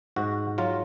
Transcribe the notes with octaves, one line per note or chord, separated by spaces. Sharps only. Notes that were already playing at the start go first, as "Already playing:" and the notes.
G#2 F#4
F#3 F4